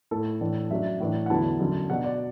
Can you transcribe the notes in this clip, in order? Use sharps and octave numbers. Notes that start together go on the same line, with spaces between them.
A2 A3 E4 A4
A2 E3 D4
F#2 F#3 D4 E5
A2 E3 D4
F#5
E2 D3 F#3 B3 E4 A5
F#2 D3 F#3
B2 F#3 D4 F#5
D5